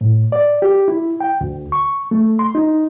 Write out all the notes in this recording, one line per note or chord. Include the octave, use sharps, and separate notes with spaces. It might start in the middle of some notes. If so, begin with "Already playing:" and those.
A2
D5
G4
E4
G5
D2
C#6
A3
C6
D#4